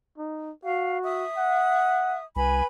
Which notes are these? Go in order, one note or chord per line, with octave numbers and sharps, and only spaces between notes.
D#4
F#4 F5
E5 D#6
F#5
C2 B4 G#5 B5